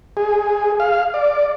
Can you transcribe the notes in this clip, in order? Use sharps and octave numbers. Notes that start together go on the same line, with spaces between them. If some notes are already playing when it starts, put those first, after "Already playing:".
G#4
F5
D5